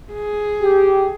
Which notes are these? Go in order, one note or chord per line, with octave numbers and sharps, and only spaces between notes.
G#4
G4